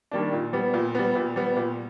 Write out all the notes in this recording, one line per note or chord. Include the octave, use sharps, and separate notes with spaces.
D#3 G3 A#3 D4
A#2
G3 B3
A#2
G3 B3
A#2
G3 B3
A#2